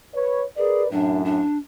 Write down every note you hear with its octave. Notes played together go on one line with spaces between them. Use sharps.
B4 C#5
G#4 A#4 B4 D5
F#2 A2 D4
D4